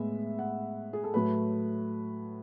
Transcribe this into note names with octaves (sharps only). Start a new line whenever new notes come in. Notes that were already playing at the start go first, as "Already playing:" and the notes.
Already playing: A2 G#3 B3 E5
F#5
G#4
A4
A2 F#3 A3 B4